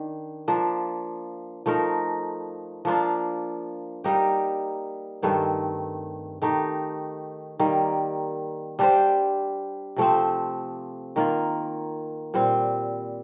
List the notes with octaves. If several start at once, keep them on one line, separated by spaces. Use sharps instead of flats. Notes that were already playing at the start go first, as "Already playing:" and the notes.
Already playing: D#3 D4
F3 A#3 D4
F3 A3 D#4 A#4
F3 A#3 D4 F4
G3 A#3 D#4 G4
G2 D#3 A3 C4
D#3 A3 D#4 G4
D#3 G3 A#3
G3 D4 G4 C5
C3 F3 A3 C4
D#3 A#3 F4
A#2 G3 C4